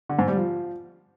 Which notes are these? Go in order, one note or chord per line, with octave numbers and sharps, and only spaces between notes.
D3
G#2
G3
F3